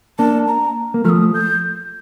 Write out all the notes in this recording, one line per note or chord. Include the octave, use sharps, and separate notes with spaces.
A#3 D4 A5
A#5
A#3
F3 A3 D#6 F6
G6